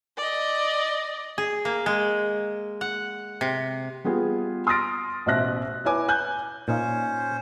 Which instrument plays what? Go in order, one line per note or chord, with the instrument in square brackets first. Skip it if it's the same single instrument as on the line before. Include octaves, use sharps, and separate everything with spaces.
[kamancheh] D5 D#5
[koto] G#4
A#3
G#3
F#5
C3
[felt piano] G3 B3 F4 G#4
C6 D#6 F6 A6 A#6 D7
A1 B2 C5 E5 F#6 A#6
E4 B4 C#5 G#5 D6
G#5 F#6 G6
[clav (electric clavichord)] A#2 D#4 F5 [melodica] C#4 C5